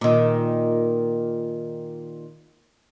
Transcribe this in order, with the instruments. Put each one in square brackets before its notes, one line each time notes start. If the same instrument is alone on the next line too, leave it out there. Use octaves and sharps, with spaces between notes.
[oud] A#2 D#3